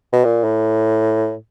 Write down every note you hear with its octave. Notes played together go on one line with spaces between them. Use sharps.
B2
A#2
A2